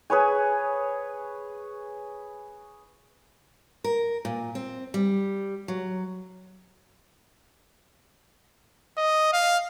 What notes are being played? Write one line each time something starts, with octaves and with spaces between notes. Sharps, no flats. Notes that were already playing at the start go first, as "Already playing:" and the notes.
G#4 B4 C#5 G#5
A#4
A#2
C4
G3
F#3
D#5
F5